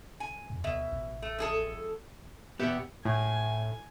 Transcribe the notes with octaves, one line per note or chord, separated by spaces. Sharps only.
G#5
F2
D2 B2 E5
A1
A3
F2 G#4 A4
E2 B2 B3 G4 E5 F#5
A2 G#5